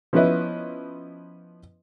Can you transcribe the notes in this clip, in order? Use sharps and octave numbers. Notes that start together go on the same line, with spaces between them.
F3 B3 C#4 E4 B4 D#5